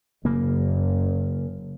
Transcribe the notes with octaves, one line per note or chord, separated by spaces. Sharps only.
F#1 C#3 A#3